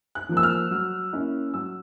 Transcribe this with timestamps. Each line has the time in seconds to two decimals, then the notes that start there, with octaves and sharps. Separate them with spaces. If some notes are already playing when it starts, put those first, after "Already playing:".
0.15 F#6
0.29 F3 A#3
0.37 E6
0.43 F6
0.71 F#3
1.13 A#3 C#4 E4
1.54 F#3 E6